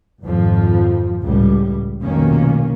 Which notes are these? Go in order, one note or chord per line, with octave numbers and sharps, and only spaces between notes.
G#1 F2 F3
C#2 A2 G3
F1 B1 B2 D#3 A#3 C#4